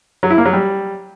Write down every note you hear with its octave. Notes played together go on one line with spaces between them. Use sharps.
F#3
E4
A#3
F#3
G3